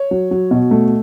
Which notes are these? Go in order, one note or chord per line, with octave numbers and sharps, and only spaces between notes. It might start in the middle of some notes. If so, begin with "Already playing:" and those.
Already playing: C#5
F#3
F#3
B2
A3